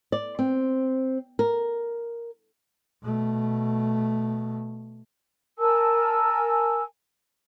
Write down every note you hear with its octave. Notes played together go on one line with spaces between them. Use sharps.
D5
C4
A#4
B2 A3
A#4 G#5 A5 E6